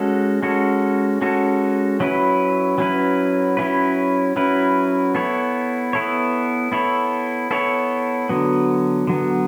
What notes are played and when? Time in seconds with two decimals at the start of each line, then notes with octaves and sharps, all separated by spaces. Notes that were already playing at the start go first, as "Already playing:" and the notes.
Already playing: G#3 C#4 F#4 A4
0.43 G#3 C#4 F#4 A4
1.22 G#3 C#4 F#4 A4
2.00 F#3 C#4 E4 B4
2.78 F#3 C#4 E4 B4
3.57 F#3 C#4 E4 B4
4.36 F#3 C#4 E4 B4
5.15 B3 E4 A4 C#5
5.93 B3 E4 A4 C#5
6.72 B3 E4 A4 C#5
7.51 B3 E4 A4 C#5
8.29 D3 F#3 B3
9.07 D3 F#3 B3